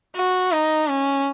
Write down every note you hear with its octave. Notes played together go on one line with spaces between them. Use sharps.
F#4
D#4
C#4